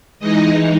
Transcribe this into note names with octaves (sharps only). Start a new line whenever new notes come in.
E3 G#3 D#4 D#5